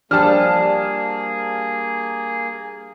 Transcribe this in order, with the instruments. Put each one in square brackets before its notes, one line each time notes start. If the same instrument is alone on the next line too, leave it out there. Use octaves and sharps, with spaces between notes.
[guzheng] F3 G3 [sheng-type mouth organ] A#3 G#4 [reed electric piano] D4 G4 [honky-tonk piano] A5 F6